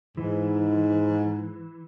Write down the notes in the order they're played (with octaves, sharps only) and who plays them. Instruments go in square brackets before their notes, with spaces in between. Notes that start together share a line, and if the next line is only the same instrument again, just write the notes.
[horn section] G#2 [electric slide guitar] E3